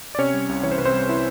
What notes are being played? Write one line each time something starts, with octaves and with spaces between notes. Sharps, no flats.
D5
C3 C#4 C#5
G3
C2
E3 C#5
C5
C3 B4
C4 C5
G3
E4 E5